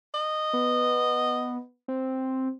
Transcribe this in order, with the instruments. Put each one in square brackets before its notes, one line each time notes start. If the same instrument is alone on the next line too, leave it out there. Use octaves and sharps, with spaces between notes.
[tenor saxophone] D#5
[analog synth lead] B3
C4